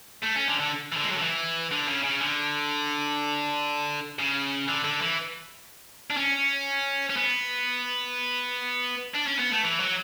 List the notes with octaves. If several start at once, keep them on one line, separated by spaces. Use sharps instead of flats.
A3
C#4
D3
D3
E3
D3
G#3
F#3
D3
E3
D3
C#3
C#3
D3
C#3
D3
D3
E3
D4
C#4
C#4
B3
D4
C#4
B3
A3
E3
F#3